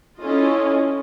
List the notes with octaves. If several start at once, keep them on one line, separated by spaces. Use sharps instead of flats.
C#4 E4 F4 A4 D#5